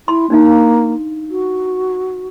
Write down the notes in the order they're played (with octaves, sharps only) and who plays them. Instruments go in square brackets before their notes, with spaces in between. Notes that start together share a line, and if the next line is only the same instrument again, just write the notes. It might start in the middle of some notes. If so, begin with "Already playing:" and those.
[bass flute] E4 [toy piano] C6
[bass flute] A#3 [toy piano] D4 D#4 F5
[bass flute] F#4